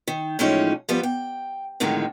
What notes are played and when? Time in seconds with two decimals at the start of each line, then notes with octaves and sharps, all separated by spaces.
0.08 D#3
0.39 A2 E3 F3 G#3 C#4 D#4
0.89 F3 G3 B3
1.03 G5
1.80 F2 A2 D3 D#3 G#3